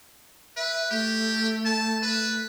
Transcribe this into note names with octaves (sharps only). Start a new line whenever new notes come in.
B4 E5
A3 G4
A5
B4